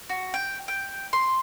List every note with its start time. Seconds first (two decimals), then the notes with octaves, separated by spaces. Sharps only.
0.09 F#4
0.34 G5
0.68 G5
1.13 C6